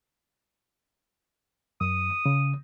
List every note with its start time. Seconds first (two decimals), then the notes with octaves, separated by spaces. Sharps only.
1.81 F#2 D#6
2.26 C#3